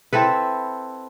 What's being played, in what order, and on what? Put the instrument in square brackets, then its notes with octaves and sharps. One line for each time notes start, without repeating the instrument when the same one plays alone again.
[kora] C4 E4 A4 B4